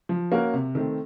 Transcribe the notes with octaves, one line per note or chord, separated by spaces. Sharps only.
F3
A#3 C#4 F#4 A#4
C3
D#3 A3 C4